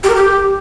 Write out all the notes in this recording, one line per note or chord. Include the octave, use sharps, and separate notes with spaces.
G4
A#4
G4